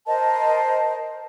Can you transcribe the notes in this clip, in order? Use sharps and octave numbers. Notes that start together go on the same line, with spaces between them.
A#4 C5 D#5 A5